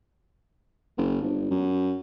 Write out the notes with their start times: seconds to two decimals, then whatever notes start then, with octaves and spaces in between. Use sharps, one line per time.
0.98 F#1
1.22 G1
1.51 F#2